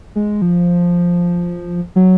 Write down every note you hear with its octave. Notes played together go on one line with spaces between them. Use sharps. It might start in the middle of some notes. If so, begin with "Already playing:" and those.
G#3
F3
F#3